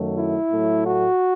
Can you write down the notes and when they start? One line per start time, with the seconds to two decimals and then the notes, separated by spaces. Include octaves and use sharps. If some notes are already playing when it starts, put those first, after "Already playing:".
Already playing: F#2 D#3 F#3 A3
0.15 E4
0.51 A2 F#3 A3
0.86 F#4